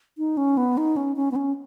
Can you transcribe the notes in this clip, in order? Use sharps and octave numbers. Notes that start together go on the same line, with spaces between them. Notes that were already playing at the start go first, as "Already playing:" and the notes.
D#4
C#4
B3
D#4
C#4
C#4
B3
C#4